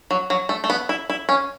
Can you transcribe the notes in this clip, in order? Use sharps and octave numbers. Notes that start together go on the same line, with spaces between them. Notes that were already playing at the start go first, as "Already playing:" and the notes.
F#3
F#3
A3
A3
B3
E4
E4
C#4